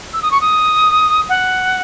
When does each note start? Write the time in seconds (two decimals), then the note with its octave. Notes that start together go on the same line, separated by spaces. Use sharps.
0.13 E6
0.22 D#6
0.31 C#6
0.41 D#6
1.29 F#5